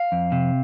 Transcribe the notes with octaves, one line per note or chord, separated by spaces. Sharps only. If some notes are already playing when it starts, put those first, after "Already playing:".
Already playing: F5
F2
C3